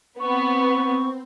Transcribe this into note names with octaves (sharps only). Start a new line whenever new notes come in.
B3 C4 C#6